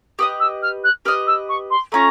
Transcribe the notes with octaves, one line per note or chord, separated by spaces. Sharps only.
G4 B4 D#5 D#6
E6
F6
F#6
G4 B4 D#5 F6
E6
C#6
C6
A3 C#4 F4 A#5